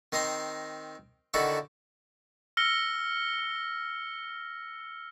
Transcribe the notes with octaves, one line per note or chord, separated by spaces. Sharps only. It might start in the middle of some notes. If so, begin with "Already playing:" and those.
D#3 C4 D#5 A#5 C6
D3 D#3 D#4 E4 F#4 A4
E6 F6 A#6 C#7 G7